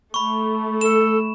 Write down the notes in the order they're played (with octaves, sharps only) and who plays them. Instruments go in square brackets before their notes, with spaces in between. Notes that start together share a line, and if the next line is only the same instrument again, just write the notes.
[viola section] A3 [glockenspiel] B5 C#6
[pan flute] A4 [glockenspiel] E7